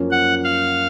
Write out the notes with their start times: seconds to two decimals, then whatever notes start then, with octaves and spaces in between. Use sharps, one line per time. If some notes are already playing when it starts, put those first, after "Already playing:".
Already playing: F#2 F3 A#3 C#4
0.11 F#5
0.44 F5